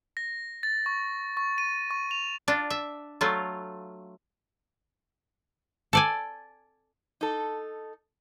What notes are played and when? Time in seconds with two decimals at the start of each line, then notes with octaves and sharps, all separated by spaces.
0.17 A#6
0.63 A6
0.86 C#6
1.37 C#6
1.58 D#7
1.91 C#6
2.11 F7
2.48 D4 F4
2.70 E5
3.21 F#3 A3 F4
5.93 A4 D5 G#5
7.21 D#4 A4